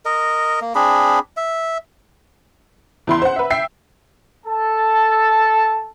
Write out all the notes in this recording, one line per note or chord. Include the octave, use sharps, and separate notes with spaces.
A#4 D#5
A#3
C4 D4 G#4 B5
E5
E2 E4 C6
C5 F#5
B4 E5
E5 G5 B6 C7
A4 A5